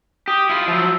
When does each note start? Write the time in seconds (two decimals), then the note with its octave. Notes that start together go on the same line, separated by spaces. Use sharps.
0.28 G4 D#6
0.49 E4 F4
0.68 F3 F#3 E5